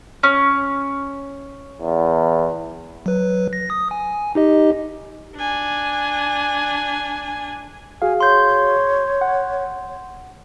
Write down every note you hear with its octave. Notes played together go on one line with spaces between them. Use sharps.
C#4
E2
F#3 B4
A#6
D#6
G#5
D#4 G4 D#5
D4 G#5
F#4 G#4 F5 G#5
C#5 C6 G6
F#5